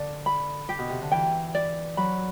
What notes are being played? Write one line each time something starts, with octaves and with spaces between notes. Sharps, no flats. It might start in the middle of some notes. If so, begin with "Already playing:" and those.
Already playing: D3 D5
B5
G4
B2
C3
D3
E3 G5
D5
F#3 B5